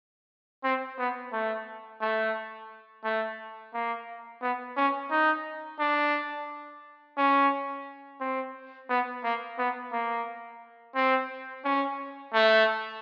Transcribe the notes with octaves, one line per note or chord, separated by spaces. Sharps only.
C4
B3
A3
A3
A3
A#3
B3
C#4
D#4
D4
C#4
C4
B3
A#3
B3
A#3
C4
C#4
A3